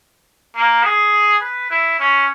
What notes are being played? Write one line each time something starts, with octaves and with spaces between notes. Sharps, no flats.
A#3
G#4
B4
E4
C#4